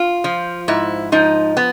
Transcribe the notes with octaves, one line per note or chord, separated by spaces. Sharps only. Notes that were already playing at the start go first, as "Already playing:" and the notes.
Already playing: F4
F3
G#2 E4
F3 D#4
B3